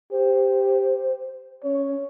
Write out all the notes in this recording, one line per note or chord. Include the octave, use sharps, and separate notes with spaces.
G4 C5
C#4 C#5